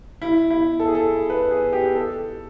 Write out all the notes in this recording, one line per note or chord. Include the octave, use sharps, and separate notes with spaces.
E4
E4
A4
G#4
A4
B4
G#4
G4
A4